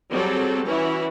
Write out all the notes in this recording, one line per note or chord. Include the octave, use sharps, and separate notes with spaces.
F#3 G3 C4 G#4 A4
E3 C#4 E4 F#4